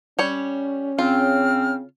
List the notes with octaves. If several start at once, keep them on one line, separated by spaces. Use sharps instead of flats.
G3 C#4 C#5
C#3 C4 F4 F6